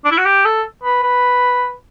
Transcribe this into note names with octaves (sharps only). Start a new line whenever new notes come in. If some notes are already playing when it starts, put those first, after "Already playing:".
D4
E4
F#4
G4
A4
B4
B4